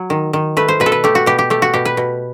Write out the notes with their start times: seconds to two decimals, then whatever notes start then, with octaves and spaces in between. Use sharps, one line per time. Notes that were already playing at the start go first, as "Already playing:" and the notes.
Already playing: F#3
0.10 D#3
0.33 D#3
0.57 A3 B4
0.68 C5
0.80 B2 B4
0.86 A4
0.92 B4
1.04 A3 G4
1.15 F#4
1.26 B2 G4
1.39 G4
1.50 A3 G4
1.62 F#4
1.74 B2 G4
1.85 B4
1.97 B2